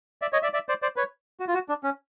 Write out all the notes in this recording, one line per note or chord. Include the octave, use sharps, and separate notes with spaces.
D5 E5
C#5 D#5
D5 E5
D5 E5
C5 D5
C5 D5
B4 C#5
F#4
F4
F#4
D4
C#4